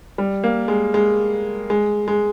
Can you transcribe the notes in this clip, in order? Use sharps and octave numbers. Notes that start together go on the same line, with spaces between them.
G3
A#3
G#3
G#3
G#3
G#3